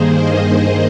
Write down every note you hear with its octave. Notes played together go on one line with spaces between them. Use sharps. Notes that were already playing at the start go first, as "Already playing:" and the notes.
Already playing: G2 D#3 A#3 G#4 C5
C5 D#5